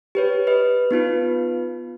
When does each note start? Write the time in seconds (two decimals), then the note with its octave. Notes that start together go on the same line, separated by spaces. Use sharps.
0.15 G4 B4 C#5
0.47 B4 D#5
0.91 B3 D#4 F4 B4